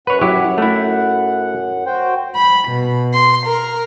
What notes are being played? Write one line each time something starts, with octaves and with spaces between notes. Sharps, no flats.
F#2 B4 C#5 F#5
F#3 E4 G4
A3 E4
F#4 C5 G5
B5
B2
C6
A#4